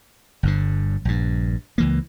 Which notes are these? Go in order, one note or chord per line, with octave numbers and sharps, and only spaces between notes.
G1 G2 D3
A#1 G2
C#2 E3 A#3